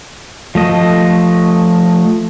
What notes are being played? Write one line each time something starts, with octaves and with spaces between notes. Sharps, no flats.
F3 A3 D#5